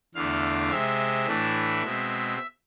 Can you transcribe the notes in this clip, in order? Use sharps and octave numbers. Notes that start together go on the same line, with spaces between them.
E2 D3 A3 D4 F5
C3 G#3 C4 E5
A2 E3 A3 D4
B2 G#3 C4